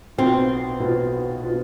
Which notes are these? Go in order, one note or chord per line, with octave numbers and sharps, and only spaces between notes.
B1 B2 B3 C4 F4
B1 B2 B3 F4
B2 B3 F4